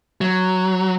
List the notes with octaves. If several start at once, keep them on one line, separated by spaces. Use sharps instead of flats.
F#3